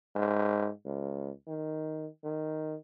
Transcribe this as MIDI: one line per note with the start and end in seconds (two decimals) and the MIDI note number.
0.16 0.69 44
0.85 1.31 37
1.48 2.07 51
2.24 2.75 51